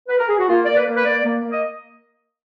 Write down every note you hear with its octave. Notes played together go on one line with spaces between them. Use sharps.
B4
A#4
G#4
F#4
A#3 F4
A#3 D5
B4
A#3
B4
A#3 D5
A#3
A#3
D#5